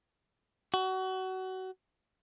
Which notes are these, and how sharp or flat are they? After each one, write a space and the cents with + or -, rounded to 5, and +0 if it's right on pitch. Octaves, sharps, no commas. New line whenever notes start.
F#4 +25